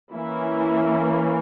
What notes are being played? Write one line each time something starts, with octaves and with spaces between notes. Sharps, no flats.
E3 A#3 C#4 E4